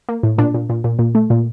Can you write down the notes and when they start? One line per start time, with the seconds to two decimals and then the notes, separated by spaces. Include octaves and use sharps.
0.09 A#3
0.23 A2
0.38 A#2 D4
0.54 A#2
0.70 A#2
0.84 A#2
0.99 A#2
1.15 A3
1.30 A#2